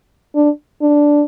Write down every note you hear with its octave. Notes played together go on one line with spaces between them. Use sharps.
D4
D4